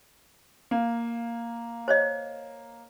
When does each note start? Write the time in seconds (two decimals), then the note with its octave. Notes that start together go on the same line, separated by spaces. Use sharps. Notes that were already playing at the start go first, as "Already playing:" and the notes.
0.71 A#3
1.88 C5 C#5 D#5